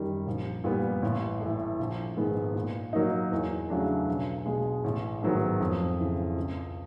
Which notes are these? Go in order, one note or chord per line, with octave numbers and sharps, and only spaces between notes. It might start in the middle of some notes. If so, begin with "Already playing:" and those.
Already playing: F#2 D#3 G3
A#1
A#2 G3 B3
A1
A2 E3 A3
A#1
G#2 D#3 G#3 B3
A#2
F#3 A#3 D#4
E2
C#3 F#3 A3 D4
B1
B2 G#3
A1
G#2 D#3 F#3 B3
F2
C#3 E3
C#2